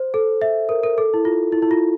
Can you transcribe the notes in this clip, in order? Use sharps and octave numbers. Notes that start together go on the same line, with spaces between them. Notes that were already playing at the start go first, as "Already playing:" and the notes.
Already playing: C5
A4
E5
A#4
A#4
A4
E4
F4
E4
E4
F4